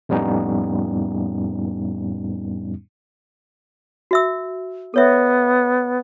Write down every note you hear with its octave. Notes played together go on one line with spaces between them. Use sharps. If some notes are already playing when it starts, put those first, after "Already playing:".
F2 A2 G3 B3 C#4 D#4
F#4 E5 E6
B3 A4 C#5 E5